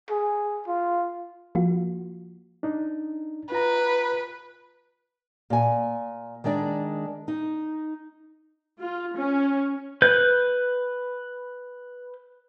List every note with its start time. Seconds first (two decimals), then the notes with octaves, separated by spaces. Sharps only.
0.11 G#4
0.67 F4
1.55 F3 A#3 F4 F#4
2.63 D4 D#4
3.52 F4 B4 A#5
5.50 A#2 G#5
6.44 D#3 G#3 D4 D5
7.28 D#4
8.80 F4
9.17 C#4
10.02 B4 G6